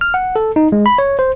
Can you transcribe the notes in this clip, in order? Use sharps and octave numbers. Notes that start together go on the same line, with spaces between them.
F6
F#5
A4
D#4
G#3
B5
C#5
C5